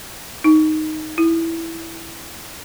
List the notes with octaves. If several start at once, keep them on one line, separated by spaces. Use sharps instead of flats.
D#4
E4